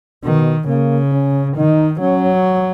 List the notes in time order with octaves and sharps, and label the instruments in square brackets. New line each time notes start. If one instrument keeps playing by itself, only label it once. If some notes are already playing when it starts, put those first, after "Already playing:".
[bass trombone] B2 [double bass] D#3
[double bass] C#3 [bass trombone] A#3
[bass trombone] C#4
[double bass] D#3 [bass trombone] D#4
[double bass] F#3 [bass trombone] C#4